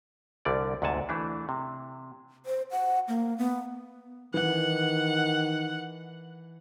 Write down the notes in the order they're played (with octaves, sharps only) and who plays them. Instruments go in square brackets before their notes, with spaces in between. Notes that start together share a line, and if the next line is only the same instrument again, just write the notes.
[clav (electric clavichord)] C2 D3 G3 D5
D2 G#2 C3 F#5 G#5 A5
E3 A3 D4
C3
[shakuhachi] C5
F#5
A#3
B3
[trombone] D#3 [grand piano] E3 [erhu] F#5